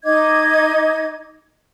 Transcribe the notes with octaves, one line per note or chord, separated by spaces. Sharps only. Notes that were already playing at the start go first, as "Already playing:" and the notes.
D#4 D#5 D6 G#6